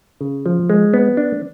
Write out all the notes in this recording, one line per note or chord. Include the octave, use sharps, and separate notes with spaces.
C#3
F3
G#3
B3
D4